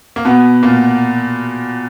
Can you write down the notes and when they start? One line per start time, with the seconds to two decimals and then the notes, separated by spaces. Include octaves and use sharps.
0.16 A#3
0.25 B2 B3
0.63 A#2 A#3